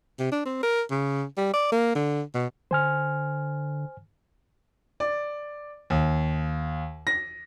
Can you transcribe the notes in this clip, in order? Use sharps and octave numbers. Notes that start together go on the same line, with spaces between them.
C3
D4
C4
A#4
C#3
G3
D5
A#3
D3
B2
D3 C5 G#5 F6
D5
D#2
A#6